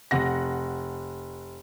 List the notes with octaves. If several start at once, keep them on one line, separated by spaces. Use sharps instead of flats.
F1 F#5 A#6